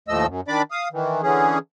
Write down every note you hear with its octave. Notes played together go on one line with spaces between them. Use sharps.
D#2 A2 F3 A3 D#5 E6
F#2
D#3 D4 D5 B5 D6
F5 D#6
D#3 E3
D3 E3 C#4 G#4